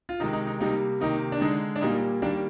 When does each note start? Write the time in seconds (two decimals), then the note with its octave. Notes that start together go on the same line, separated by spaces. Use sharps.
0.09 F4
0.20 C3 D#3 G#3 D#4
0.33 D#4
0.47 D#4
0.60 C3 G3 A#3 D#4
1.00 C3 D#3 A#3 D#4
1.32 D4
1.41 D3 G#3 D#4
1.76 D4
1.81 A#2 G3 A#3 D#4
2.22 D#3 G3 A#3 D4